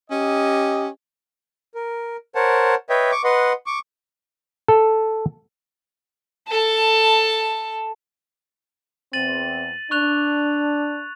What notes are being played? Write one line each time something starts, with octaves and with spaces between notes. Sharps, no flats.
C#4 G4 D#5
A#4
A#4 C5 C#5 F#5 A5
B4 C#5 D#5 E5 G5
C#6 D6
B4 D#5 F#5 C6
C#6 D6
A4
A4 A5
E2 C4 A6 D#7 F#7
D4 C#6 F#6 F7